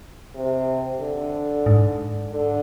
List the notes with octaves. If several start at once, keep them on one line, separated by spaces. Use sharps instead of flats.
C3
D3
G#2
D3